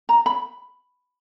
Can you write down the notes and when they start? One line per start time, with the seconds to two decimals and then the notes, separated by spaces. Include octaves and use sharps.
0.09 A#5
0.26 B5